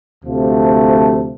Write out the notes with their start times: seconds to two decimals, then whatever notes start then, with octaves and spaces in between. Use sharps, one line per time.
0.23 D2 C3 F3 A3